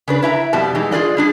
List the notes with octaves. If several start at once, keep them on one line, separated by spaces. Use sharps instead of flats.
C#3 D4 B4
E4 E5 A5 A#5
F2 B2 G3 A5
E3 G#3 D#4
F4 G#4 B4 D5 D#5
G3 D4 G#4